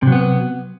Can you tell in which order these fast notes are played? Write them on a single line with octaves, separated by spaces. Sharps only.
C3 F#3 B3